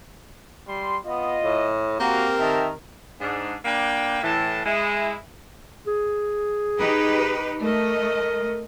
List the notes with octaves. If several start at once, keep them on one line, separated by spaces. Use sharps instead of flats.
G3 C6
B3 F4 D#5
A2
A#3 C4 F#4 G4 A#4
D#3 E5 G5 A5
G#2 D4
A#3 D4 B4 G5
A2 E3 A5
G#3 E4
G#4
D#4 G4 B4
A3 A#4 D#5